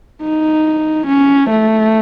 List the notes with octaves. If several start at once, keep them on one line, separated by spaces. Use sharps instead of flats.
D#4
C#4
A3